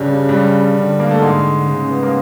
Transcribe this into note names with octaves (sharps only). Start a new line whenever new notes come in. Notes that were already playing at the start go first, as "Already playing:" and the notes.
Already playing: G2 C#3 G3
G2 G3
D3
A#3
A3
G#2 G#3
C#3
B3
A#3